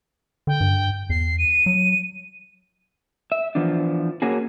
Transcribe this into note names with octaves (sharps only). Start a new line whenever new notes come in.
D3 G5
G2
E2 C7
D#7
F#3
E5
E3 F3 B3 D4
A#3 C#4 F#4 G#4